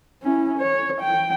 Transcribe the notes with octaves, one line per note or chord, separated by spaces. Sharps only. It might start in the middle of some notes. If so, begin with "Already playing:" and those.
C#4 E4
C#5
G5